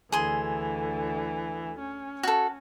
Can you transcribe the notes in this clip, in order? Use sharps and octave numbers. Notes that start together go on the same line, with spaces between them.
D2 D3 E3 G#4 C6
C#4
F#4 A4